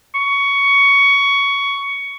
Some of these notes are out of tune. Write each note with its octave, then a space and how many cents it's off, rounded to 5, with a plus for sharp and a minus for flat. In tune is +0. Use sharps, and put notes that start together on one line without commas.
C#6 +15